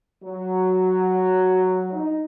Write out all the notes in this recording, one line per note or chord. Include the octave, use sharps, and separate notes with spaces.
F#3
D#4